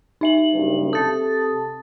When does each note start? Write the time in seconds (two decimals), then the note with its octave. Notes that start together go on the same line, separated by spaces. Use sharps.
0.21 D#4 E5 F#7
0.52 F#1 G2
0.93 C3 A4 A5 D#6 A6